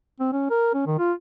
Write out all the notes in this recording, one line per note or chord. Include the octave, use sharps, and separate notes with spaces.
C4
C#4
A#4
C#4
D#3
F4